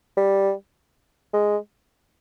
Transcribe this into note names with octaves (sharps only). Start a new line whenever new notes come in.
G3
G#3